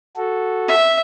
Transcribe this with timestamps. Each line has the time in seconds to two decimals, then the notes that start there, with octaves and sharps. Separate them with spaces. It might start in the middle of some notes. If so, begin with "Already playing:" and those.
0.17 F#4 A4
0.68 E5